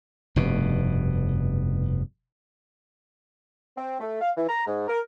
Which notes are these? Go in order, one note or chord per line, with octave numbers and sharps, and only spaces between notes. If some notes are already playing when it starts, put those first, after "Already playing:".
F1 G2 B2
C4
A3
F5
E3
A#5
G#2
A#4